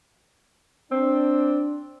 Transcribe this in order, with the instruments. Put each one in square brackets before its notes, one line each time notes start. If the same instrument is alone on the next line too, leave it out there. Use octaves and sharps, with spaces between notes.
[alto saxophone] C4 [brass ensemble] D4